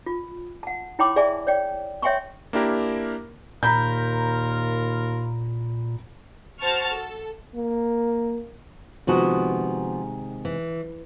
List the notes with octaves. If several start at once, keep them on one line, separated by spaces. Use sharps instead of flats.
F4
F#5 A5
E4 C#5 G5 B5 C6 D6
G#4 D5 E5 G#5 A5 C6
C#5 D5 G5
C#5 E5 G5 G#5 C6 C#6
A#3 D4 E4 G4 A#4
D#2 A#2 F4 A#4 A#5 B5 G6
F#4 C5 A5 C#6 F6
A4
A#3
C3 D#3 F3 G#3 B3 F#4
E3